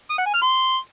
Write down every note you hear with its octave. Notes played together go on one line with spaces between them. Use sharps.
D#6
F#5
G#5
F6
C6